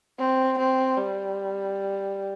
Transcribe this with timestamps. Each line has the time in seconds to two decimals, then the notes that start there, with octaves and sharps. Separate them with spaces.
0.19 C4
0.58 C4
0.97 G3